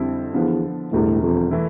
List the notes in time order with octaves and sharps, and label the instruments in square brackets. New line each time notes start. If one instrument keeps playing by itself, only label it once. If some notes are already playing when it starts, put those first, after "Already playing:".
Already playing: [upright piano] F2 D3 G3 C4 E4
[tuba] E2 [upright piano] D3 F3 B3
[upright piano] E1 E2 D3 G3 [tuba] A2
[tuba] F2
[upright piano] E3 A3 E4